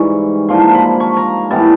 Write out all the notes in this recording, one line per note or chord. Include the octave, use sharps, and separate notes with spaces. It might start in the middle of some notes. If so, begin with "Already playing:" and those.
Already playing: G#2 E3 G3 B5 C#6
G#2 F3 A#3 D4 C6
B5
C#6
A#5
A2 E3 G3 B3 A5